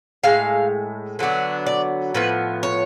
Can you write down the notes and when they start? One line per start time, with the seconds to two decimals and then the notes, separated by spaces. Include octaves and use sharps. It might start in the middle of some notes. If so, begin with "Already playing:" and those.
0.23 A2 G#3 F5
1.19 D3 F#3 B3 D4
1.66 D5
2.14 A2 F3 B3 B4
2.63 C#5